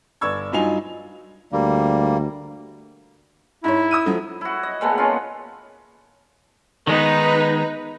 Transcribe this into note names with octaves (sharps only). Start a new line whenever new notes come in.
G1 D5 C#6 E6 G#6
G2 F#3 D#4 F4 G#5 F7
D2 G3 A#3
G#2 E4 C#5
D#6 E6 D#7
F3 F#3 A3
E4 F#4
D#5
A#2 G#3 A3 B3
C#4 F4
D#3 G#3 B3 D#4 B4